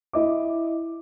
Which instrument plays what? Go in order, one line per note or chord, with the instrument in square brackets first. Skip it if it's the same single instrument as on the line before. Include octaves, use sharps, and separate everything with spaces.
[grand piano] E4 D#5 D6